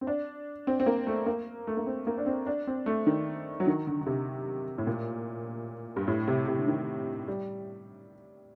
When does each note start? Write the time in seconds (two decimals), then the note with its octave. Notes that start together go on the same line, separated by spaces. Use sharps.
0.01 C4
0.07 D4
0.67 C4
0.80 C4
0.86 A#3
1.07 A3
1.26 A#3
1.67 A3
1.77 A#3
1.86 C4
2.07 A#3
2.18 D4
2.26 C4
2.46 D4
2.67 C4
2.86 A3
3.07 D#3
3.60 F#3
3.67 D#3
3.87 D3
4.01 D3
4.06 C3
4.78 A2
4.87 A#2
5.96 G2
6.08 A2
6.27 C3
6.48 C3
6.58 D3
6.67 D#3
7.28 G3